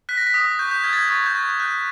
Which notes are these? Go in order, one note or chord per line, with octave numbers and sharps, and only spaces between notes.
F#6 B6
A#6
B6
D#6
C#6 G6
G6
F6 G#6
A6
G#6
C#6 G#6
G6
C#6
G#6
F#6 G6